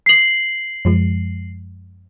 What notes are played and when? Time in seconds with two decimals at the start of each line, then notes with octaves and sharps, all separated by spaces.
0.06 C7 F#7
0.85 F#2 F3 G#3